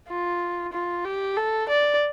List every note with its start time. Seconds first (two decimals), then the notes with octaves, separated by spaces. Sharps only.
0.08 F4
0.73 F4
1.05 G4
1.37 A4
1.69 D5